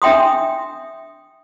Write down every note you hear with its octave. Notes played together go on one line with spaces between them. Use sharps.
D4 E5 G5 C6 D#6